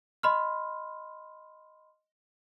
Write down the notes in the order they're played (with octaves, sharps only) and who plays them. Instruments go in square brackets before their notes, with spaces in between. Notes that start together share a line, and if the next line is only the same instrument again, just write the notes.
[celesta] D#5 B5 C6 F6